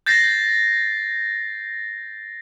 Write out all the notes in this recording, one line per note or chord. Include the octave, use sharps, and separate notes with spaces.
G6 A6 A#6 C7